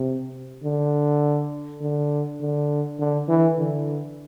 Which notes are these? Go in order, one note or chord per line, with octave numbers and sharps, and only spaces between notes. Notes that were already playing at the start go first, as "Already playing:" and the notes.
Already playing: C3
D3
D3
D3
D3
E3
D3